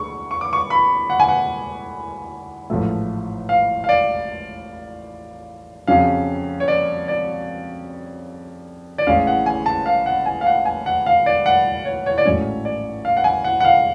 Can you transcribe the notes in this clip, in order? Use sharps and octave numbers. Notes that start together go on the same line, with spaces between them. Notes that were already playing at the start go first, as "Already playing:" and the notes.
Already playing: D2 D3 G#3 C#6
C#6
D6
C#6
B5
F#5
G#5
F#5
A1 G#2 F3 A3
F5
F5
D5
F2 C#3 F#3 C#4 F5
C#5
D5
D5
D5
A1 A2 G#3 C#4 F5
F#5
G#5
A5
F5
F#5
G#5
F5
F#5
G#5
F#5
F5
D5
F#5
C#5
C#5
D5
A1 G#2 F#3 A3 C#4 C#5
D5
F5
F#5
G#5
F#5
F#5
F5